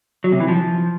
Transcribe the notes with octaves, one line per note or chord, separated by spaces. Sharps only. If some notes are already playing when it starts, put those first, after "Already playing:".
F#3
C3
E3
F3